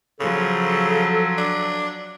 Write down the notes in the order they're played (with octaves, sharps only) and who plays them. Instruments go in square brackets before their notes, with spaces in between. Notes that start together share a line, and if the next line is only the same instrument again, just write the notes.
[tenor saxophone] C#3 [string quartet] F3 F#3 [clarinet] A4
[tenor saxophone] D4